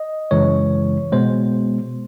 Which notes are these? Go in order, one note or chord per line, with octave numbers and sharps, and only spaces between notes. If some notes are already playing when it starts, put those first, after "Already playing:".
Already playing: D#5
F#2 C#3 E3 G#3 C#5
B2 G#3 B3 C5